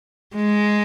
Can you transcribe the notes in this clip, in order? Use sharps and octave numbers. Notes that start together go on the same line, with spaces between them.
G#3